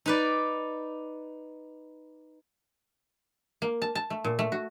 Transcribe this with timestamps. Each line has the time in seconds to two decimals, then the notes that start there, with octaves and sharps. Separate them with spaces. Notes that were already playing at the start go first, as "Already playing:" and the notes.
0.06 D#4 B4 D5
3.62 A#3
3.82 A5
3.95 A5
4.10 A3
4.24 A#2
4.39 A3
4.52 F#4